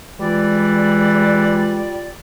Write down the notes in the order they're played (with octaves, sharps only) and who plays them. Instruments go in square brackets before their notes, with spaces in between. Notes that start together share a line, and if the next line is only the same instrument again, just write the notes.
[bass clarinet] E3 [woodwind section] G3 F4 D5 [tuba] G#3